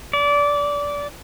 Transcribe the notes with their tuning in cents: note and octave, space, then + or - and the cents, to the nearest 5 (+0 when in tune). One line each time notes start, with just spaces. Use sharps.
D5 -20